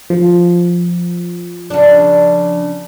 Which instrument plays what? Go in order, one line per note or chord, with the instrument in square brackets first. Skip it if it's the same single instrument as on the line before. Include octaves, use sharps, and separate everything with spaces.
[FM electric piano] F3
[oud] C#3 D4